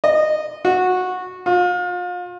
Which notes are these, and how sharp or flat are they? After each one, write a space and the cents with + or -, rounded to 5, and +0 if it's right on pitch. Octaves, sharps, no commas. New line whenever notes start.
D#5 -15
F#4 -15
F4 +35